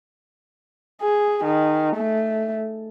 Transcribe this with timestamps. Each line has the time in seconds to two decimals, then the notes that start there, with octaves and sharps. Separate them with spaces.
1.02 G#4
1.45 D#3
1.96 A3